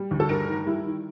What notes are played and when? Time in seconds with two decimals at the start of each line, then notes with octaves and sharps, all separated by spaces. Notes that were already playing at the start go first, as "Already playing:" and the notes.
Already playing: G3
0.11 D2
0.20 A4
0.29 G2 A#4
0.48 D#3
0.66 G3 E4
0.85 D#3